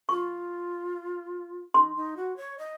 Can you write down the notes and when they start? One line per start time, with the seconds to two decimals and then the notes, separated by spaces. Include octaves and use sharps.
0.09 F4 C#6
1.74 D#4 C6
1.96 D#4
2.17 F#4
2.37 C#5
2.59 D#5